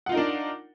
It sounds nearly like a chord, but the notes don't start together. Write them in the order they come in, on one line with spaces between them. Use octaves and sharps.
F#5 F4 D#4 A#4 D4